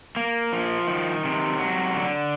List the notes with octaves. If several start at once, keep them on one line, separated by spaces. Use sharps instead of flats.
A#3
F3
D#3
C3
F#3
D3